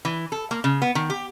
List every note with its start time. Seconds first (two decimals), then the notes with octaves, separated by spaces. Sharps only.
0.05 E3
0.32 A4
0.51 A#3
0.64 C#3
0.82 B3
0.95 D#3
1.10 G4